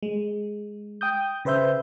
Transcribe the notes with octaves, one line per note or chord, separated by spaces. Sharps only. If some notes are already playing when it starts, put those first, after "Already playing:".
G#3
G5 D#6 G6
C#3 B4 C5 E5 G6